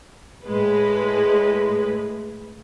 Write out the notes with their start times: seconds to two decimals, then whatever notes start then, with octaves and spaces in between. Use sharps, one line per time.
0.45 A2 G#3 B4